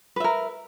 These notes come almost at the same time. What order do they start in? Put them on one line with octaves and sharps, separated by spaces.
B4 E5 A#4